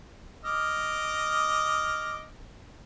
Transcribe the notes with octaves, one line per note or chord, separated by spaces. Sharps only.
D#5 D6 F6